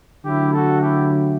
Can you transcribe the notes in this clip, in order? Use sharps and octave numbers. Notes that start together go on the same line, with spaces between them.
D3 F#3 A3 E4 G4
F#4 A4
E4 G4